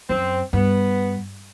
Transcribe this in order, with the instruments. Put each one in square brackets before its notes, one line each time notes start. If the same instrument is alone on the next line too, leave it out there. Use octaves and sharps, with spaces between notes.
[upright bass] F#2 [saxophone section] C4
[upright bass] G2 [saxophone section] B3